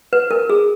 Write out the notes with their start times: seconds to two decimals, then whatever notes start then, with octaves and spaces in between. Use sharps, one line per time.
0.13 B4
0.31 A#4
0.50 G#4